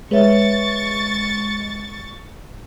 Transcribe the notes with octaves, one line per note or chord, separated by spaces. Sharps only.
G#3 B4 C#5 E5 C#6 A6